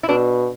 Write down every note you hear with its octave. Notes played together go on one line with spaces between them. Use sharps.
E4
B2 D4